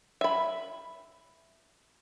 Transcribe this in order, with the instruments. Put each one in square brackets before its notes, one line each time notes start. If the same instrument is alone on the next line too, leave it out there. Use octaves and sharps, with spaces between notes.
[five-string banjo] E5 B5